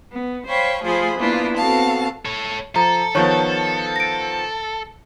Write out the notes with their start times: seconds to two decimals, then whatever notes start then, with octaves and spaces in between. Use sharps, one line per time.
0.13 B3
0.48 C5 C#5 F5 G5 B5 C#6
0.84 F3 A3 F4 G#4 C5 B5
1.18 A#3 B3 D4 E4 F4
1.57 B3 C4 F#4 A4 F5 A5
2.25 A4 C#5
2.76 F3 A4 A#5
3.15 D#3 F3 B3 C#5 A5 C#6
3.96 A#6 D7